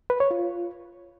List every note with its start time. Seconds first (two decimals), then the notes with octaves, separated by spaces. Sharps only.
0.10 B4
0.20 C#5
0.31 F4